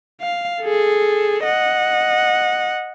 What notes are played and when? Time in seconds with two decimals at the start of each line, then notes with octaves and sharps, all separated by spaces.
0.21 F5
0.63 G#4 A4
1.45 D#5 F#5